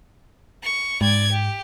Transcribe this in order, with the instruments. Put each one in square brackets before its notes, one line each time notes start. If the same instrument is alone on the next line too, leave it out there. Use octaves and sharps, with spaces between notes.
[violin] C#6
[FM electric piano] G#2 [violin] D5 G#6
[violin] G4